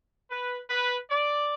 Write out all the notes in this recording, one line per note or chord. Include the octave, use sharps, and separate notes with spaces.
B4
B4
D5